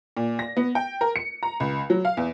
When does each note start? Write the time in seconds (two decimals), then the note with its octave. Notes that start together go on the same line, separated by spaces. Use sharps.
0.17 A#2
0.39 A#6
0.57 B3
0.75 G5
1.01 A#4
1.16 C#7
1.43 A#5
1.60 C#2
1.90 F#3
2.05 F5
2.17 E2